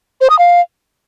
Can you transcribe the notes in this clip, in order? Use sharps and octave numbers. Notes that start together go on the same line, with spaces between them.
C5
D#6
F5